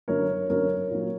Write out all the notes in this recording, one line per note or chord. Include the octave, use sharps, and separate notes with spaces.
F#2 D3 F#3 A#4 C#5
F#2 D3 F#3 A#4 C#5
A#2 F#3